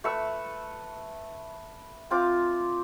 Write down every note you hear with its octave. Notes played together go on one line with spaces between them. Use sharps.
A3 B4 C#6 E6
C4 F4 D6